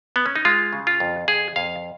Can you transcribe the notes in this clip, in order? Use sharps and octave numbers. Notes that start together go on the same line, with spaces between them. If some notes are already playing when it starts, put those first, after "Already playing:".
B3
C#4
D#4
G#3 F4
C#3
F4
F2
F2 G#4
F2 F5